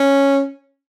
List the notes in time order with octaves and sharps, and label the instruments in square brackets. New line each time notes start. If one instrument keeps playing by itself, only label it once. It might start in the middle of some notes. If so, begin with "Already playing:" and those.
Already playing: [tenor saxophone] C#4